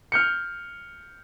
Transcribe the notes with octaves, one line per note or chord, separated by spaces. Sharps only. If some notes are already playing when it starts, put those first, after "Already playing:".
F6 G6 C#7